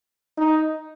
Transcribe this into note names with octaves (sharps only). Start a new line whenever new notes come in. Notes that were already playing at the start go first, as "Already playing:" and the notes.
D#4